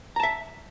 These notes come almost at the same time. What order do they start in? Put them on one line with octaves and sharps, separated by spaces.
A#5 A5 E5